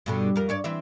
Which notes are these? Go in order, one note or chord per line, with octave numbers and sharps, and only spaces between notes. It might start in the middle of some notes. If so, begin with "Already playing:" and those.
G2 B2 D3
F2 A#4
G2 C#5 D5
E3 C4 E5